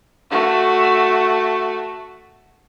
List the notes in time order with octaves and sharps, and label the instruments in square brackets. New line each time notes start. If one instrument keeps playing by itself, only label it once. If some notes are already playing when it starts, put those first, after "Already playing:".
[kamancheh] A3 F#4